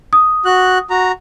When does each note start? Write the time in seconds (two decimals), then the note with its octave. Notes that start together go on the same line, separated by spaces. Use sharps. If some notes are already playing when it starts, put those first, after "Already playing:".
0.13 D#6
0.45 F#4 F#6
0.90 F#4 A#5